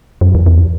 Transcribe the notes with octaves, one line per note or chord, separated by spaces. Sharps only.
F#2
E2
E2